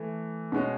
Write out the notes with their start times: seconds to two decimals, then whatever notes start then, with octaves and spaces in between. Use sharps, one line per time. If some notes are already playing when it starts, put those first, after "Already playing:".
Already playing: E3 A3
0.52 B2 G#3 C#4